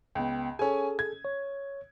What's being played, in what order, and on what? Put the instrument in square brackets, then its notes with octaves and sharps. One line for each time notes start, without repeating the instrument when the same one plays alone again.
[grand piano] C#2 [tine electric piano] B3 G5
[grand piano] C#4 G#5 [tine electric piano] G#4 A4
[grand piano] G#6
[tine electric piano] C#5